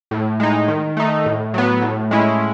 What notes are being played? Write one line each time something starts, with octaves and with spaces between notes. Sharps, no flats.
A2
G#3 D#4
D#3
A3 D#4
A2
F#3 B3
A2
G#3 C#4 E4